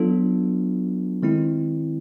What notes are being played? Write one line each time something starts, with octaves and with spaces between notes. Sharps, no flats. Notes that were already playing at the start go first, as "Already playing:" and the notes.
Already playing: F#3 B3 D4 F4 A4
D#3 G#3 C4 E4